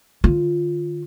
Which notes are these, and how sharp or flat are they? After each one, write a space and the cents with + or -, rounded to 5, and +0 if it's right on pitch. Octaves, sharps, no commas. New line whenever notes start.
D3 +45 F4 +0